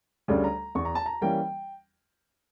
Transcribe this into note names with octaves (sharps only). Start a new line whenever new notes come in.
D2 C#3 G3 D4
A#5
E2 C#6
A#5
A5
A#5
E3 G3 A#3 C#4 G5